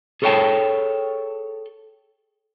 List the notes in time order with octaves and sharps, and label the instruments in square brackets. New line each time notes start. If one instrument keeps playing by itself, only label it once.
[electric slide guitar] G#4 A4 C#5 D#5 G5 A5